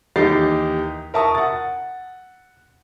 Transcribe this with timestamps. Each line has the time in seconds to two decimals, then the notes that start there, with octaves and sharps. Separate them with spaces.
0.16 D#2 E3 D#4 G4 A6 C7
1.14 A#4 E5 A5 C#6 D#6
1.35 F#5 A6